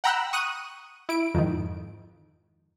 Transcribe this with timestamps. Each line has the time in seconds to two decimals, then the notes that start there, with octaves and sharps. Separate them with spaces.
0.04 F#5 G5 A#5 B5 E6 F#6
0.33 C#6 D#6 F#6 D#7
1.09 E4 D7
1.34 F2 G#2 D#3